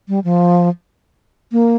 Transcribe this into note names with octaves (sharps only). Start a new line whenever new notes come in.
G3
F3
A#3